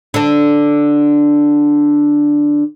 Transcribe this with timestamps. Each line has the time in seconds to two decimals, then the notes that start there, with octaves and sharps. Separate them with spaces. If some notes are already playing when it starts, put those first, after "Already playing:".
0.14 D3 D4